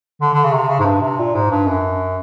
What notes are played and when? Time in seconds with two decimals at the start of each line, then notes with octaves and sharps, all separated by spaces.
0.21 D3
0.34 D3
0.44 C#3
0.53 C3
0.69 C#3
0.79 G#2
0.85 G2
1.01 C3
1.19 A#2
1.35 G#2
1.50 G2
1.67 F#2